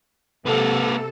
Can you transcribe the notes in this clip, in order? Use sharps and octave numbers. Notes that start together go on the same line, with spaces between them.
C3 A#3 A4 B4